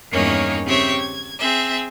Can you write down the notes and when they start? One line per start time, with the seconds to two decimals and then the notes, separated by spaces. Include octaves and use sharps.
0.12 E2 G2 D#3 A#3 C#4 C#5
0.64 C#3 C4 G4 C#5 E5
0.99 G#6
1.38 C4 G#4 E5